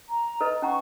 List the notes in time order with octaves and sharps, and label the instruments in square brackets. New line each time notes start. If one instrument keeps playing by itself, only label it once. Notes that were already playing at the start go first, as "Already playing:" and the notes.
[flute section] A#5
[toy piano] A4 B4 D#5
[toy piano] C#4 F#5 A#5 [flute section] C#6